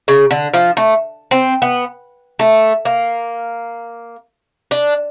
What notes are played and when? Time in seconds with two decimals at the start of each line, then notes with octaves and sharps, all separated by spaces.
0.08 C#3
0.31 D3
0.54 F3
0.77 A3
1.31 C4
1.62 B3
2.39 A3
2.85 A#3
4.71 D4